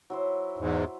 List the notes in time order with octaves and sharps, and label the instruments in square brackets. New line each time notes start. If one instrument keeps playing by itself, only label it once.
[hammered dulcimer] F#3 E4 C5
[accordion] E2 G#2